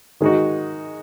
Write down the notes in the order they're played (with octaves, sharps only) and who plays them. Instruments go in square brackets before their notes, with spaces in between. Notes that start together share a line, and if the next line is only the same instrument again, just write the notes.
[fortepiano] D#3 G#3 D#4 F#4